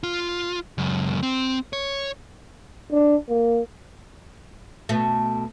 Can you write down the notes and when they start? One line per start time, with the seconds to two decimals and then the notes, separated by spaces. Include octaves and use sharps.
0.03 F4
0.78 C#2 F#2
1.23 C4
1.73 C#5
2.92 D4
3.29 A#3
4.89 B2 A3